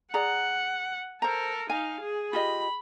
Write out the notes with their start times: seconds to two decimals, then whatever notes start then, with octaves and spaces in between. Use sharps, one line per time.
0.14 G#4 D5 F#5 A#5
1.22 A4 A#4 C5 A#5
1.70 D#4 F5 G#5
2.01 G#4
2.33 F4 G4 D#5 B5